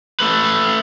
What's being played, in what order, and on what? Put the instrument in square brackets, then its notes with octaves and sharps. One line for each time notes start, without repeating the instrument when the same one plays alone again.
[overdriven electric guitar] A3 B4